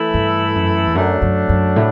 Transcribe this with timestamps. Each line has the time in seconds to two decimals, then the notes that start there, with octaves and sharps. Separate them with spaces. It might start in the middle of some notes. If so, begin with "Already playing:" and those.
Already playing: E3 A3 E4 A4
0.14 G2
0.55 F#2
0.87 E2
0.95 F#2 F#3 A3 D4
1.22 F#2
1.49 F#2
1.76 A2